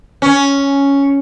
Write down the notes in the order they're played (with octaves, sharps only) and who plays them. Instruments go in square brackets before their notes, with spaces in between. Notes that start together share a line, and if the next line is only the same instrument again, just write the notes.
[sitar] C#4